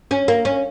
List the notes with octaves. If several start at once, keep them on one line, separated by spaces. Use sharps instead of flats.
C#4
A#3
C#4